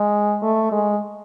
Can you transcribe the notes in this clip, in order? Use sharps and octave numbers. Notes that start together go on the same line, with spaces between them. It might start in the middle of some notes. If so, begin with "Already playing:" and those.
Already playing: G#3
A3
G#3